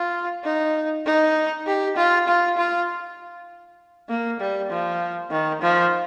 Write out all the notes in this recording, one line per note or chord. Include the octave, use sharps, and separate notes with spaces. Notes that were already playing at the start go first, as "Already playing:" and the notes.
Already playing: F4
D#4
D#4
G4
F4
F4
F4
A#3
G3
F3
D#3
F3